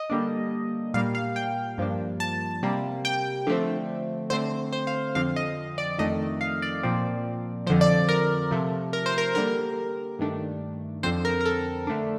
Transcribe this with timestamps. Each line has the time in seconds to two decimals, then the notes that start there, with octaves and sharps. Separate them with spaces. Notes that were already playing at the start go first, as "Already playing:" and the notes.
Already playing: D#5
0.10 D3 G3 A#3 D4
0.94 A#2 G3 A#3 F5
1.15 F5
1.36 G5
1.78 G2 F3 A#3 D4
2.20 A5
2.63 C3 G3 A#3
3.05 G5
3.47 D3 F3 A3 C4
4.30 D3 A3 C4 C5
4.73 C5
4.87 F5
5.15 F2 D3 F3 C4 F5
5.36 D#5
5.78 D5
5.98 F2 D#3 A3 D4 D#5
6.41 F5
6.62 D5
6.83 A#2 F3 C4
7.67 F3 C5
7.70 F2 D3
7.81 D5
8.09 A#4
8.51 C3 F3 A3
8.93 A#4
9.06 C5
9.18 A#4
9.35 D3 G3 A#3 A#4
10.19 G2 D#3 A3 D4
11.03 F2 D3 F3 C4 C5
11.25 A#4
11.41 A#4
11.46 A4
11.87 D3 A3 D4